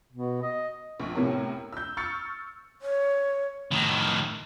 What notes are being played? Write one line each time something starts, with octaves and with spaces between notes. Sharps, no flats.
B2
D#5
A#1 C#6
A2 C3 B3 C#4 A#4
E6 G6
C#6 E6 F6 A6 C#7
C#5
A2 D#3